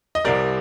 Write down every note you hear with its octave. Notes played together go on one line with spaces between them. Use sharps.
D#5
C2 C3 G3 A#4 D5